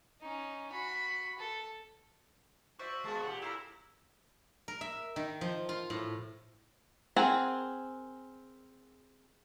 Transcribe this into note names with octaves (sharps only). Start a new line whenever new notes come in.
C#4 D#4
F#4 B5
A4
F#4 C5 D5 E5
G#3 A#3 B3 F5 A5
A#2 G4 F#5
E4 A4 F5 A#5
A#4
E5
D#3
F3
F4
A2
C4 G#4 A#4 F#5 G#5